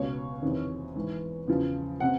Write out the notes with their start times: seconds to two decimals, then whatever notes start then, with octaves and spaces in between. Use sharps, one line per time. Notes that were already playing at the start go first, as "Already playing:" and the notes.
Already playing: C#2 B2 C#5
0.42 E2 C3 D#3
0.96 G#2 E3
1.47 E2 C#3 F3
2.00 C3 F#5